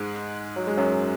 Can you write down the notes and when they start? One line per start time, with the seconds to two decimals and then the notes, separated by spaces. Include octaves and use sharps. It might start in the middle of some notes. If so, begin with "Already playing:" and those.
Already playing: G#2 G#3
0.56 F#3
0.67 G#3
0.77 F#2 F#3